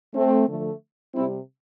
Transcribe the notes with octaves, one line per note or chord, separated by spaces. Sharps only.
A3 C4
D3 F3 A3
C3 G3 C4 E4